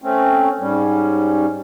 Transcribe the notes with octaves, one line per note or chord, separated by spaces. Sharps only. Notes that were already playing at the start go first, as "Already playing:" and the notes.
A3 C4 C#4
G#2 G3 C#4